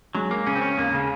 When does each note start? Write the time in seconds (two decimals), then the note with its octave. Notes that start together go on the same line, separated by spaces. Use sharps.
0.15 F#3 G#3
0.31 A#3
0.46 C#3 C#4
0.55 C4
0.62 C#4
0.77 D#2 A#3
0.94 C#3